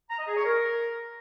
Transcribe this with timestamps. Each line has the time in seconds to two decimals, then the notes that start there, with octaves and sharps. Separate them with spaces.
0.10 A#5
0.19 D#5
0.27 G#4
0.36 C#5
0.45 A#4